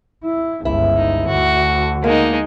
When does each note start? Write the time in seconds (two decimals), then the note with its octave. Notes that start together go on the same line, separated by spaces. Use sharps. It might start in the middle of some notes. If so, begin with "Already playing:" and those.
0.25 E4
0.65 G1 C#2 E4
0.96 D#4
1.28 D2 D3 F#4
2.04 G#3 A#3 D#4